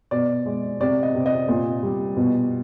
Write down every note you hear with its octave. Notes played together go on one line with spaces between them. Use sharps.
B2 D5
G#3
C3 D5
D#5
C3
D#5
A#2
G3
B2